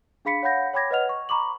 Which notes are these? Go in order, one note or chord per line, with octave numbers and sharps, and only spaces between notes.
D4 G#4 F5 B5 B6 C#7
C#5 F5 F#5 B5 G6 A#6
C#5 G5 B5 D6 G#6 A#6
B4 C#5 D#5 F#5 F6 F7
C#6
A#5 B5 C#6 D6 F#7